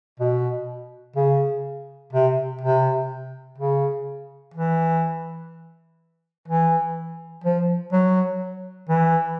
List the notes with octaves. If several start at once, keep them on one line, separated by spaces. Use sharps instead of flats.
B2
C#3
C3
C3
C#3
E3
E3
F3
F#3
E3